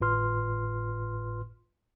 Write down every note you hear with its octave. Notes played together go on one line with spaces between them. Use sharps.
G#1 A2 F4 B4 C6 F6